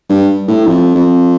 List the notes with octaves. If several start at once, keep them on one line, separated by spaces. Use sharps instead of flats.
G2
A2
F2
F2